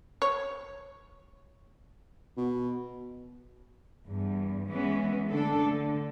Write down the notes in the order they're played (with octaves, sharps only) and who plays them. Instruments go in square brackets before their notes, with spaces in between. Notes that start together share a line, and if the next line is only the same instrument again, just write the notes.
[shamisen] C#5
[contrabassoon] B2
[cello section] E2 G2
E3 G#3 B3 C#4
D3 A3 D4 A4
D3